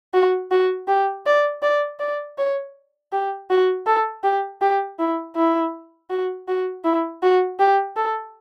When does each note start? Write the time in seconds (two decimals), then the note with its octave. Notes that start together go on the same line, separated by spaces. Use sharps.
0.14 F#4
0.51 F#4
0.88 G4
1.26 D5
1.62 D5
2.00 D5
2.38 C#5
3.12 G4
3.50 F#4
3.86 A4
4.23 G4
4.61 G4
4.99 E4
5.36 E4
6.10 F#4
6.48 F#4
6.84 E4
7.23 F#4
7.59 G4
7.96 A4